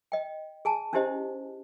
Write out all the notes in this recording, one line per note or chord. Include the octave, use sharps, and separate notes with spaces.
D#5 G5
G#4 G#5 A5
C#4 D4 E4 G4 C5 D#5